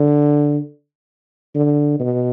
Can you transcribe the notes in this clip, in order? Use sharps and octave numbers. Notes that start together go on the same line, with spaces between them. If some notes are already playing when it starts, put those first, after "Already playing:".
Already playing: D3
D3
B2